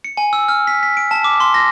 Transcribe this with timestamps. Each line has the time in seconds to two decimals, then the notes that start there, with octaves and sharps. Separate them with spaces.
0.04 C#7
0.17 G#5
0.33 E6
0.48 F6
0.67 B6
0.83 B6
0.97 D7
1.11 A5
1.24 D6
1.40 C6
1.54 A#6